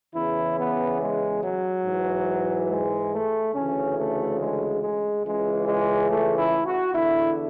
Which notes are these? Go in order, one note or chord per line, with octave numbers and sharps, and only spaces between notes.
E2 C#3 E3 E4
B3
G#3
F#3
G#2 E3
G#3
A3
D2 C#3 E3 C#4
A3
G#3
G#3
C#2 C#3 E3 G#3
G#3
A3
E4
F#4
E2 D3 E4